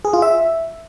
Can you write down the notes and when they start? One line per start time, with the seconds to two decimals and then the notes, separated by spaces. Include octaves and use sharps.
0.05 G#4
0.13 F4
0.22 E5